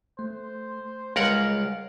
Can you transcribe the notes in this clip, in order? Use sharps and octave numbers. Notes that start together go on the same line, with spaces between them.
A3 C5
C#2 G3 G#3 A#4 F5 F#5